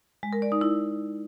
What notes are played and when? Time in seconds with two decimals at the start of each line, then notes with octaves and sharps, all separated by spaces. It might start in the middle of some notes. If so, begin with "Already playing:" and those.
0.23 G#3
0.33 A#4
0.42 D5
0.52 D#4
0.61 E4